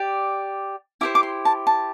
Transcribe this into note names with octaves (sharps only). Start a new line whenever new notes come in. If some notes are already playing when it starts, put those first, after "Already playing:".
Already playing: G4 D5
E4 G4 C5 D6
D6
C6
A5
A5